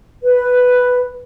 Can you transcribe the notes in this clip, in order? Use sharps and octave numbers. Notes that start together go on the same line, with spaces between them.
B4